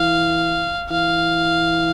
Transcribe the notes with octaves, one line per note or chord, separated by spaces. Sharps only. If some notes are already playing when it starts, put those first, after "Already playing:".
Already playing: E3 F5
E3 F5